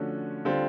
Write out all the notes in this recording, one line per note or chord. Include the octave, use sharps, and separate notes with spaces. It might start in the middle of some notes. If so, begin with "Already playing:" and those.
Already playing: D3 F3 A3 C#4 F#4
D3 G3 C4 F4